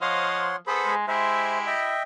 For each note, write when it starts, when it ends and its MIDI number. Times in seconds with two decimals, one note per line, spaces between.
0.02 0.57 53
0.02 0.47 72
0.02 0.56 73
0.02 0.47 75
0.02 0.47 77
0.02 0.56 78
0.02 0.56 84
0.67 0.92 59
0.67 0.95 68
0.67 0.92 69
0.67 0.95 72
0.67 0.95 83
0.86 1.06 56
1.08 1.68 56
1.08 1.91 64
1.08 1.91 67
1.08 1.58 72
1.08 1.58 76
1.67 2.03 75
1.67 2.03 76
1.67 2.03 79